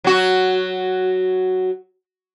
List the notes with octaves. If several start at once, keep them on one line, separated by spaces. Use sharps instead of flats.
F#3 F#4